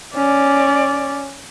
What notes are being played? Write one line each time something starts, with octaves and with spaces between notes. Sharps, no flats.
C#4 D5